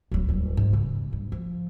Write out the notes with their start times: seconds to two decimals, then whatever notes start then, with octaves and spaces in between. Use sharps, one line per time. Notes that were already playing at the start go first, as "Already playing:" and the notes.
0.12 D1 F#3
0.29 D#1 G3
0.57 G#2
0.73 C#3
1.13 G2
1.32 F3